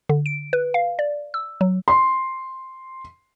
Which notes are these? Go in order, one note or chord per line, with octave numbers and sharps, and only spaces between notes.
D3
D7
B4
F5
D5
E6
F#3
C6